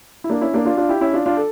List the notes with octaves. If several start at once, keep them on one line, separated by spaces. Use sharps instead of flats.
E4
A#3 D4
C#4 E4
A#3 D4
D4 F4
D4 F4
E4 G4
C#4 E4
D4 F4
D4 F4
A4